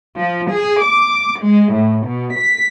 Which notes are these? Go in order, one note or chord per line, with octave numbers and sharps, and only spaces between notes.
F3
G#4
D6
G#3
A2
B2
B6